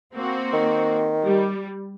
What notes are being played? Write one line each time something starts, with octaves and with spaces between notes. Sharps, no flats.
A#3 C4 F#4
D#3
G3